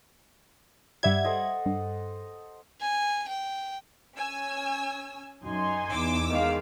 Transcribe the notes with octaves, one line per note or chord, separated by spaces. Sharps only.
G2 G3 E5 F#5 G#6
A4 C5 D#5
G2
G#5
G5
C#4 G#5 E6
F#2 D#4 G#5 C6
E2 D6 E6
D#3 G#3 F5